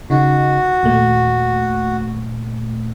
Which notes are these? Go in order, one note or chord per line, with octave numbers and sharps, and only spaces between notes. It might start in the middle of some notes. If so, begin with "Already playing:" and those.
C#3 D#4 F#4
D#2 A#2 A3